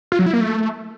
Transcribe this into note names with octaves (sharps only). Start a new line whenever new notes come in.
F4
F#3
E4
A#3
A3